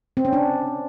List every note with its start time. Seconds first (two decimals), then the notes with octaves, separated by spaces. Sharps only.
0.17 C4
0.25 C#4
0.33 D4